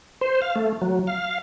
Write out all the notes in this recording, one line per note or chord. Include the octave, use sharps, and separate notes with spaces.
C5
F5
A3
F#3
F5